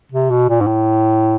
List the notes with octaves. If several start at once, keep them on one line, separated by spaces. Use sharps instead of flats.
C3
B2
A#2
G#2
A2